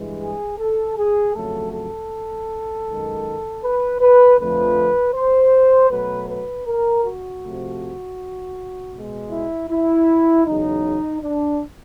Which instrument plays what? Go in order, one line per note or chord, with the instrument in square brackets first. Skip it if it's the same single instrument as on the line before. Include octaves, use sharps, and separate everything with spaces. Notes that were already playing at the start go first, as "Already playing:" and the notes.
Already playing: [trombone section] G2 E3 G#3
G#4
A4
G#4
F2 C#3 F#3 A3 A4
A4
F#2 D#3 G#3
B4
B4
F2 D3 F3 A3 B4
C5
B2 F#3 A3 B4
B4
A#4
F#4
C3 F3 A3
B2 G#3
E4
E4
E2 C#3 F#3 D#4
D4